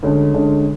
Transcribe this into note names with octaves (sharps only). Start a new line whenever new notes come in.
D2 D3 G#3 C#4
D2 D3 G#3 C#4